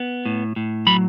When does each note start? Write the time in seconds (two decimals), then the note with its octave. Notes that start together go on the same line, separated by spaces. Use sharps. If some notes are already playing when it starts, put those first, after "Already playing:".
Already playing: B3
0.25 A2
0.56 A2
0.87 F#3 B5